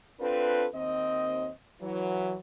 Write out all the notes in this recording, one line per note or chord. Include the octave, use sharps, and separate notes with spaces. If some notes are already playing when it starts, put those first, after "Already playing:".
C4 D4 F4 A4 B4
D#2 C4 D#5
E3 F#3